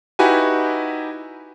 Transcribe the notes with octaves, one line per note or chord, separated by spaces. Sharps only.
D#4 E4 F#4 G4 B4 G#5